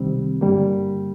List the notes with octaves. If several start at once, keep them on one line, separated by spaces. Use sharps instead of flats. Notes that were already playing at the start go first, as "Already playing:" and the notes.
Already playing: C2 C3 D#3 G3 C4
G2 D3 G3 A#3